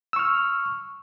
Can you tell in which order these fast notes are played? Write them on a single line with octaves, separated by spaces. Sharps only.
E6 C#6 F6